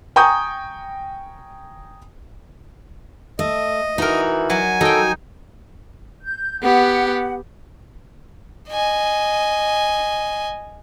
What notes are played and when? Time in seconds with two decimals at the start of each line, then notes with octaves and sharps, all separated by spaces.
0.16 G5 G#5 A#5 C#6 D#6 G6
3.39 A3 D#5
3.98 E3 D#4 F#4 A#4
4.50 F#3 G#5
4.81 F#3 D#4 A4 G5
6.22 G6
6.62 B3 G4 F#5
8.70 D#5 G#5